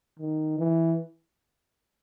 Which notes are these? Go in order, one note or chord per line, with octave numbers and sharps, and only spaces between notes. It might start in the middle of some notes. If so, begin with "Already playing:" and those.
D#3
E3